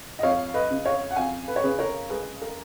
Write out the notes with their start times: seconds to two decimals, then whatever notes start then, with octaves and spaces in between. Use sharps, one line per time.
0.19 D#5
0.23 F2 C#5 F5
0.54 B4 D#5
0.70 C#3
0.85 C#5 F5
1.11 F#5
1.16 F2 F5 G#5
1.48 B4
1.56 C#5
1.63 C#3 G#4 B4
1.79 A#4 C#5
2.09 G#3 G#4 B4
2.42 A#4